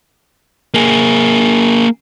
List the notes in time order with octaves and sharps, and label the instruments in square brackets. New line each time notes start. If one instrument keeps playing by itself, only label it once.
[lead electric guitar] A#3 G#4